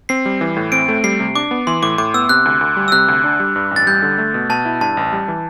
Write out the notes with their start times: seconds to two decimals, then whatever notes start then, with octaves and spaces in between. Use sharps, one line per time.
0.09 C4 C7
0.26 G3
0.41 E3
0.57 A2
0.72 C4 D7
0.88 A3
1.04 G3 C7
1.20 C3
1.35 D4 D6
1.51 B3
1.67 E3 C6
1.82 A2 D6
1.98 A2 D6
2.14 B3 E6
2.29 C3 F#6
2.45 D2
2.61 D2
2.77 G3
2.88 E6
2.92 C3 F#6
3.08 D2
3.24 D4
3.40 G3
3.56 G2
3.71 A1
3.76 A6
3.87 G3 G6
4.02 D3
4.18 A3
4.34 B2
4.49 B2 A5
4.65 E4
4.81 G2 A5
4.97 A1
5.13 G3
5.28 E3